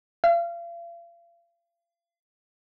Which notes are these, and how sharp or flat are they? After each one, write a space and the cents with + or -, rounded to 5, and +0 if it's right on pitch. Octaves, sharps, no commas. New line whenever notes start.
F5 -40